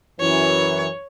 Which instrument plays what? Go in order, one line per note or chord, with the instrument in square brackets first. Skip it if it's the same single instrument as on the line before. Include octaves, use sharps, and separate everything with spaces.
[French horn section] F#2 E3 [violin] C#5